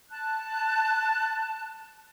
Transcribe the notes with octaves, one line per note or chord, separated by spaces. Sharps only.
A5 F#6